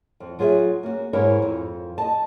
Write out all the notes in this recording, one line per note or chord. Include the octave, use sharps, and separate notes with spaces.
F2
F#3 F4 G#4 B4 E5
A#3 C#4 F#4
G#2 E4 G4 A#4 C#5
F2
D#5 A5